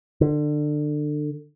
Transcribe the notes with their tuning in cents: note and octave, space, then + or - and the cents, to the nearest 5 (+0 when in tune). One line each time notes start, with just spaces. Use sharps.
D3 +25